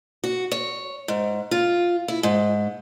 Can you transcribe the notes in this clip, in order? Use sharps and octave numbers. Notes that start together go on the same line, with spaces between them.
F#4
C#5
G#2
F4
E4
G#2